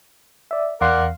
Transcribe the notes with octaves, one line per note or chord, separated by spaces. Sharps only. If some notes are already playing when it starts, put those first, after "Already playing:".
D5 E5
E2 A#4 D5 F5 F#5 C6